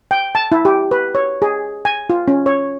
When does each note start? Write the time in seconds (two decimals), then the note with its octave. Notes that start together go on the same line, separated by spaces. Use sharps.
0.11 G5
0.35 A5
0.52 E4
0.65 G4
0.91 B4
1.15 C#5
1.42 G#4
1.85 G#5
2.10 F4
2.28 C#4
2.46 C#5